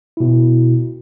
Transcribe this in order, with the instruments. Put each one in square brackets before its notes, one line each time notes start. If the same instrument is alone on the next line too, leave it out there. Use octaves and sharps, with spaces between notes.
[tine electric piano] B2 E4